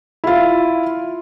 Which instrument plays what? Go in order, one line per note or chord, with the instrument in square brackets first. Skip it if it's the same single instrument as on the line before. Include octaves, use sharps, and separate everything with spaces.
[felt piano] E4 F4